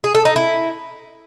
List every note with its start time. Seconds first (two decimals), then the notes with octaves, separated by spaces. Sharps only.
0.04 G#4
0.15 A4
0.25 D#4
0.36 E4